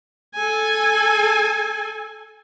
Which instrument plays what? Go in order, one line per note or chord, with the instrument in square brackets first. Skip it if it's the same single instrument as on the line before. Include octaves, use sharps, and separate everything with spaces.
[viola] A4 G#5